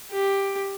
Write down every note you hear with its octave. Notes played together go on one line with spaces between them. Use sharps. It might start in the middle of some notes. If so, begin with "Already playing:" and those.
G4